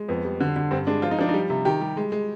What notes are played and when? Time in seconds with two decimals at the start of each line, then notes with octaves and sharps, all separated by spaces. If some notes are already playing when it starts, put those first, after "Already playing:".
Already playing: G#3
0.09 F2 B3
0.25 G3
0.40 D3
0.56 D3
0.71 G2 C4
0.87 G#3 D4
1.02 F3 F4
1.11 D#4
1.19 F3 D4
1.29 D#4
1.34 G3
1.50 C3
1.65 D#3 G4
1.81 G3
1.97 G#3
2.12 G#3